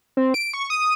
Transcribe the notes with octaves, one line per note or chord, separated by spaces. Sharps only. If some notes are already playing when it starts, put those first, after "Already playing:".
C4
D7
C#6
D#6